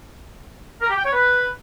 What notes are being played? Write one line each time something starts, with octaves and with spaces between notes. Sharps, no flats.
A#4
G4
G5
C#5
B4